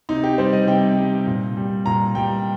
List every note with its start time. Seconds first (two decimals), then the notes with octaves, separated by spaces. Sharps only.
0.09 C3 D#4
0.24 G4
0.38 G3 C5
0.53 D#5
0.68 C3 G5
0.98 G3
1.27 A#2
1.57 G3
1.86 A#2 A#5
2.15 G3 G5